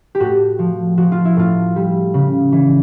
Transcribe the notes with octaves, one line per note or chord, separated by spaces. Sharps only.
G4
A2 F#4
F3
F3 F#4
F4
E4
A2 F4
G3
C#3
E3